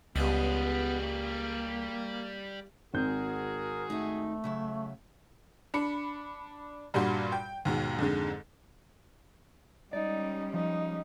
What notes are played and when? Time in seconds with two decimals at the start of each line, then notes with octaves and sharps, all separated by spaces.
0.16 C#2 G2 G3 B3 G#4 D#5
1.01 A#3
2.94 G#1 C4 F#4 G#4 A#4 G6
3.90 A3 D#4 E5
4.44 C#3 F#3 E5
5.74 D4 B5 C#7
6.94 G2 A#2 G3 F#4 C6
7.32 G5
7.65 D#2 G#2 B2
7.98 F2 G#2 D3 G#3
9.93 G3 G#3 C#4 D#4 D5
10.54 F3 D#4